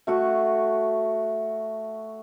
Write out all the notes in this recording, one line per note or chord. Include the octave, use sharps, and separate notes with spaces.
A3 F#4 F#5